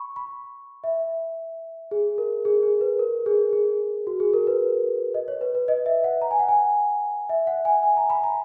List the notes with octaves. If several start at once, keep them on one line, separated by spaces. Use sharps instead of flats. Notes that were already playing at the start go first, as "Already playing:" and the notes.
Already playing: B5 C#6
B5
E5
G#4
A#4
G#4
G#4
B4
A#4
G#4
G#4
F#4
G#4
A#4
B4
D#5
C#5
B4
B4
D#5
E5
F#5
A#5
G#5
F#5
G#5
E5
F#5
G#5
G#5
A#5
B5
A#5